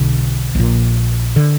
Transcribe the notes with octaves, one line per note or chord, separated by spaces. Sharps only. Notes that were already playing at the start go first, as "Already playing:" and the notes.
Already playing: B1 B2 D3
A#1 A#2
D3